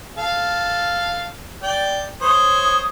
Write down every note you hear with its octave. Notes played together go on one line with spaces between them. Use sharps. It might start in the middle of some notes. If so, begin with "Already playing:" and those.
A4 F5
D5 G5
C5 C#5 D#6